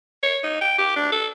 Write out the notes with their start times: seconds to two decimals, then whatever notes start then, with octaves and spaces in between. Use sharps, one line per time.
0.23 C#5
0.43 D#4
0.61 G5
0.78 G4
0.96 D4
1.12 A4